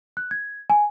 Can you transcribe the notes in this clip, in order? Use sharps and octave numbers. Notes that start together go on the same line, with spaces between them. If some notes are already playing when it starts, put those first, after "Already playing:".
F#6
G#6
G#5